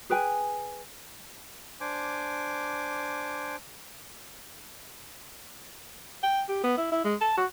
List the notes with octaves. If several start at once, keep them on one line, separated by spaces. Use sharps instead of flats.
G#4 B4 G5 G#5
D4 C5 G#5 D6
G5
G4
B3
E4
E4
G#3
A5
F#4